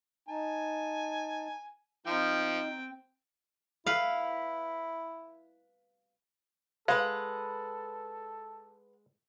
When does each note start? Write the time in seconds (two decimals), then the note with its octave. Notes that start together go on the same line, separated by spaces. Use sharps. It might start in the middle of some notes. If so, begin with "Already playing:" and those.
0.29 D#4 G#5 A5
2.06 F3 C4 D#4 G5
3.86 E4 B4 F5
6.88 G#3 A4 B4 F5 F#5